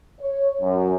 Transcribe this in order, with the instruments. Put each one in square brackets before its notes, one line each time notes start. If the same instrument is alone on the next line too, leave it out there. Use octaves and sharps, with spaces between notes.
[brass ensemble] C#5
F#2